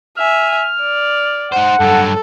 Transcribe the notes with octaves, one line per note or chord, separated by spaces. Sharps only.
E5 G#5 F6
D5
D#4 C5 F#5
G2 F#3 A4